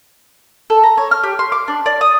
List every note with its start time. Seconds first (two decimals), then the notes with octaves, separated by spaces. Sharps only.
0.70 A4
0.83 A#5
0.98 C#5
1.11 F6
1.23 G4
1.39 C6
1.52 D6
1.68 D4
1.86 D5
2.01 D#6